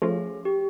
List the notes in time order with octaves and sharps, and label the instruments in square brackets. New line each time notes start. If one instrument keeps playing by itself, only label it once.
[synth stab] F3 A3 C#4 F4 [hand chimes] G#4
[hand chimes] G4